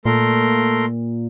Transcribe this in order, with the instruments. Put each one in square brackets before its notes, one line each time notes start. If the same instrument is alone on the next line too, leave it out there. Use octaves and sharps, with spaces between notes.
[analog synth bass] A#2 [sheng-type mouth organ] A3 A#4 C6